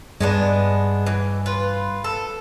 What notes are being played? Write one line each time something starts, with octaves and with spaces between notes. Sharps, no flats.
G2 G#3 B3 D4
E3
F4 B4
A4